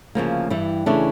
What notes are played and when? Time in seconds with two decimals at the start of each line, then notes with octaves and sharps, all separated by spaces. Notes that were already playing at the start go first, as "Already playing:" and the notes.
0.15 D2 C#3 F3 A#3
0.50 G2 E3 G3
0.86 C#3 E3 A3 D4